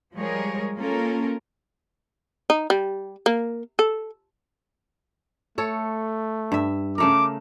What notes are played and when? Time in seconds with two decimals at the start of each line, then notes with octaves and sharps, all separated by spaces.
0.15 F3 G3 G#3 G#4 A#4 C#5
0.78 A#3 C#4 F4 A4 A#4
2.50 D#4
2.70 G3
3.26 A#3
3.79 A4
5.58 A3 A4 C#5
6.52 G2 E5
6.98 C#3 A3 A#4 D6